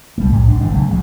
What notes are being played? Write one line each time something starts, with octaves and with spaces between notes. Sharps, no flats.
C2 G3 A3
C2 F2 A2 G#3
C2 F#2 D4
G1 E3 G#3 D4
A#1 C#3 F#3 A3
A1 F3 F#3 G#3